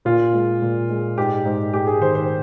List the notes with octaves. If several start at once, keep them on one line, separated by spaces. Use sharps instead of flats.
A#2 F4
G#3
A#2
G#3
G#2 G4
G#2
G#3 G4
G#4
D#3 C5
C5